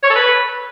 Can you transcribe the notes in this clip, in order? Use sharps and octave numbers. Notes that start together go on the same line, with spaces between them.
C#5
A4
B4